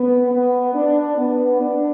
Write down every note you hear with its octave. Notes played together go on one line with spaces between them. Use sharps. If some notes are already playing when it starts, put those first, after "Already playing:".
Already playing: B3
B3
D4
B3
D4